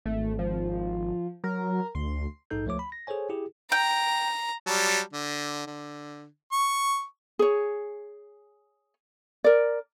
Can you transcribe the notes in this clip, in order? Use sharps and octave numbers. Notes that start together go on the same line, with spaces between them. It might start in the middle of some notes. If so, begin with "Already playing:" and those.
G#1 A3
F3
F#3 A#4
D2 C6
A#1 G#2 D#4 A4 G6
C#2 F3 A3 C#5 D6
B5
A#6
G#4 A4 C5 C#5 G#5
E4 G4 G#4
G5 A#5
F#3 G3 A5
D3
D3
C#6
G#4 C#5
A#4 D5